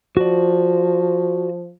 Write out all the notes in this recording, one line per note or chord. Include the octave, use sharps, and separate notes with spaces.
F3 F#4 D5